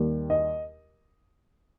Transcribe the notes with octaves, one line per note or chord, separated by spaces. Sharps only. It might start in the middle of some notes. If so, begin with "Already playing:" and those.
Already playing: D#2 D#3 G3
D#5